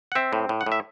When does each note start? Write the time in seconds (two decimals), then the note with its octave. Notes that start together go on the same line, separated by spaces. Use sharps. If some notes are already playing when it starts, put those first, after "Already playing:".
0.12 F#5
0.15 C4 E5
0.33 A2
0.49 A2
0.61 F#5
0.66 A2
0.72 E5